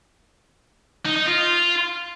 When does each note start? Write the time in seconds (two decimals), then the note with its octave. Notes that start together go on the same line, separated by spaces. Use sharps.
1.05 D#4
1.16 D#4
1.26 F4